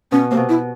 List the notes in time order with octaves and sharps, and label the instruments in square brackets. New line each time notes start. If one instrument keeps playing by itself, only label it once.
[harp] B2 [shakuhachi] C#4
[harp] C3 [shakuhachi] A#3
[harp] B2
[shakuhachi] E4